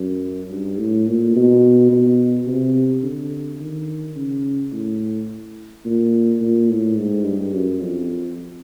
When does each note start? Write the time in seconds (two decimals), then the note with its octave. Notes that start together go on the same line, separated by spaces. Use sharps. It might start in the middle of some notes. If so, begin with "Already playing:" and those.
Already playing: F#2
0.51 G2
0.79 A2
1.07 A#2
1.36 B2
1.91 B2
2.47 C3
3.03 D3
3.60 D#3
4.16 C#3
4.72 A2
5.85 A#2
6.41 A#2
6.70 A2
6.98 G#2
7.25 G2
7.53 F#2
7.81 F2